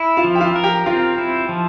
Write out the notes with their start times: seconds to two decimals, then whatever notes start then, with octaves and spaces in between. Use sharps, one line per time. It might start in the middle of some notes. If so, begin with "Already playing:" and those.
Already playing: E4
0.17 F4 F5
0.24 F3
0.35 G5
0.40 F4 F5
0.56 A#4
0.64 G4 G5
0.86 C4 F4 F5
1.18 E4
1.49 F3